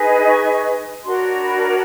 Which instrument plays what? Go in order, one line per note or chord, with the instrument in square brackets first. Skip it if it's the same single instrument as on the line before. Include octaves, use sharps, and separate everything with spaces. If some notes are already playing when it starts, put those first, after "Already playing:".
Already playing: [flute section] D#4 G#4 B4
C#6
D4 F#4 A#4 C#5 C6
B5